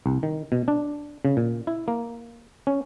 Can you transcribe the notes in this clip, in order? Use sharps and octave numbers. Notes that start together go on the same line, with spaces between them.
C2
D#3
B2
D4
C#3
A#2
E4
A#3
C#4